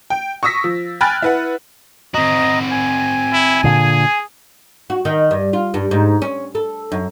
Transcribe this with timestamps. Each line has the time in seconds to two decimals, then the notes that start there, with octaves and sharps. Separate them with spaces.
0.10 G5
0.43 C#6 D#6 E6 A#6 B6
0.64 F3
1.01 G5 G#5 B5 F6 F#6 A6
1.22 E4 B4 F#5
2.14 C4 F#4 D#5 A#5
2.71 G#5
3.33 E4
3.64 A#2 D3 G#4
4.90 F#4
5.05 D#3
5.31 G2
5.53 F4
5.74 G2
5.91 G#2
6.22 C#4
6.55 A4
6.92 F#2